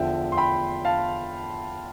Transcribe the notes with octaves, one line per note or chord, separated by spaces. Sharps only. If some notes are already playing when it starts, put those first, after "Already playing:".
Already playing: E2 D3 F3 E5 G5
C6
G5 B5
F5 A5